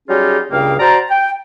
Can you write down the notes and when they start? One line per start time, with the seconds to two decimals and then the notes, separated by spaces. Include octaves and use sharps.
0.08 F#3 G3 C#4 D#4 F4 G#4
0.51 C#2 G2 C#3 A#3 F5 G5
0.79 F#4 C5 D5 A5 A#5
1.10 G5